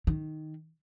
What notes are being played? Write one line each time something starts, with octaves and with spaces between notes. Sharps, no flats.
D#3